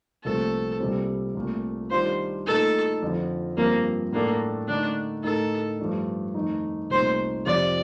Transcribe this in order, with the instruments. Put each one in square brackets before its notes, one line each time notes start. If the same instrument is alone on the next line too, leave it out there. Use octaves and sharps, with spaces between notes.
[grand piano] C2 A#2 F3 A3 C4 [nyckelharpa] A4
[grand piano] C2 A#2 G3 C4
C2 A#2 A3
[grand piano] D#3 G3 D4 F4 [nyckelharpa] C5
[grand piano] A#2 A3 D#4 [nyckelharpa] A4
[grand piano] F2 D3 F3
[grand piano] G2 F3 C4 [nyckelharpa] A#3
[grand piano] A2 A3 D4 A4 [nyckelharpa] A#3
[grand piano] D3 A3 D#4 [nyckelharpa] D4
[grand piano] A2 A3 D#4 A#4 [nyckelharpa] A4
[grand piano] G2 F3 A3 D4
F2 D#3 A3 D#4
[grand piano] C2 A#2 A3 D#4 [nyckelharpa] C5
[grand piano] F2 C3 F3 C4 F4 [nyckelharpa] D5